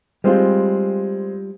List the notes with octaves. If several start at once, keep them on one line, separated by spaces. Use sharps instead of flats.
G3 G#3 C4 F4